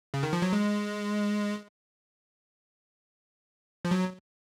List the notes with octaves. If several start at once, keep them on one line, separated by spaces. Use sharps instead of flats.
C#3
D#3
F3
F#3
G#3
F3
F#3